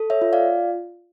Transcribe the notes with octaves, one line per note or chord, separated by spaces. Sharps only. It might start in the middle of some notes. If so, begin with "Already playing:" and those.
Already playing: A4
C#5 E5
F4
D5 F5